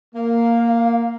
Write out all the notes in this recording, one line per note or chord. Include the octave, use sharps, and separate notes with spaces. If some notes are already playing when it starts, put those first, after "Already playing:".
A#3 F5